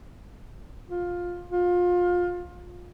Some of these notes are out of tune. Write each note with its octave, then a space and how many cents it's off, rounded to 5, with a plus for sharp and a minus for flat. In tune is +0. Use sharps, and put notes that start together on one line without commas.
F4 +15
F4 +25